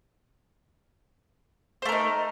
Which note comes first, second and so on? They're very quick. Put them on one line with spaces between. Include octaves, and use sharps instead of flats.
C5 A3 A#4 D#4